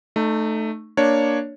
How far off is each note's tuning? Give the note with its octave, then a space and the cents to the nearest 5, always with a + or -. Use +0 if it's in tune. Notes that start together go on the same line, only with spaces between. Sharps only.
A3 +0 D#4 -30
A#3 +5 D4 +0 C#5 +0